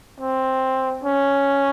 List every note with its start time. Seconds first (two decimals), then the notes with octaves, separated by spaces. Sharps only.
0.20 C4
1.04 C#4